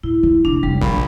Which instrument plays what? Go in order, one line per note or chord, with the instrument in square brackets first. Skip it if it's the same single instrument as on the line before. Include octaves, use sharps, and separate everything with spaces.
[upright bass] A2 [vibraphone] E4
[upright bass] D3 F3
[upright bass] F1 [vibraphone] D4
[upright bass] F1 [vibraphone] G3
[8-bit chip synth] A#1 [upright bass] D3 [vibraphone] B5